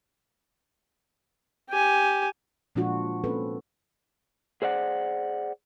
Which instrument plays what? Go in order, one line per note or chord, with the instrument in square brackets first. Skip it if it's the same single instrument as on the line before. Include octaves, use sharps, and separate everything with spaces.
[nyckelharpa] G4 G#5
[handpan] A#2 F3 G#3 D4 F4 F#4
A#3 C4 C#4 A4 B4
[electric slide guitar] G#4 C5 D5 F#5